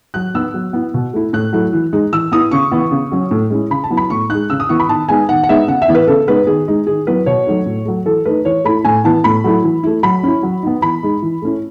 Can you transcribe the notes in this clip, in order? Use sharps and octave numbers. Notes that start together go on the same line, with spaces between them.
F#3 F#6
B3 D#4 E6
F#3
B3 E4
B2
A3 E4
A2 F#6
F#3 A3 E4
E3
G#3 D#4
E3 E6
B3 E4 D#6
C#3 C#6
E3 B3 E4
C#3
F#3 C#4
A2
G#3 C#4 E4
C#3 B5
A5
F#3 B3 E4
B5
A2 C#6
G#3 D#4 F#6
C#3 E6
D#6
E3 B3 E4 C#6
B5
D#3 A5
G#3 B3 D#4 G#5
D#3 F#5
F#5
G#3 B3 D#4 E5
C#3 F#5
E5
E3 B3 E4
B4
C#3 A4
G#3 B3 D#4 B4
D#3 G#4
G#3 D#4
D#3 G#4
F#3 B3 E4 B4
B2 C#5
F#3 A3 D#4
A2
F#3 A3
E3 A4
A3 D#4 B4
E3 C#5
A3 E4 B5
A2 G#5
E3 B3 E4 A5
A2 B5
F#3 A3 E4
E3
A3 E4
F#3 B5
C#4 E4
F#3
B3 D#4
E3 B5
G#3 D#4
E3
A3 C#4 E4